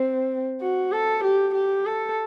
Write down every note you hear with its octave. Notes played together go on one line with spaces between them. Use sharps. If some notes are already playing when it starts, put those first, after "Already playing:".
Already playing: C4
F#4
A4
G4
G4
A4